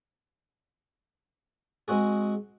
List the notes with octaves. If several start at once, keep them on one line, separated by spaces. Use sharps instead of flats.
G#3 C4 F#4 G#4